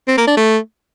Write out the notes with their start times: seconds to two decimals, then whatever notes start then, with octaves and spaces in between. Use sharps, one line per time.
0.08 C4
0.17 A#3
0.27 D4
0.37 A3